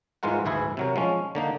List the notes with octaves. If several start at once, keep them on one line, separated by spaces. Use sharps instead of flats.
G#2 E3 G#3 F4 A#4 F#5
D2 G#2 E3 E4 G#4
C3 F#3 A#4
F3 G#3 C#4
D3 A#3 D#4